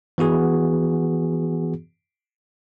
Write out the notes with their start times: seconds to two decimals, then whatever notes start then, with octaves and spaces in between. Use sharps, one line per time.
0.18 E3 B3 F#4 G#4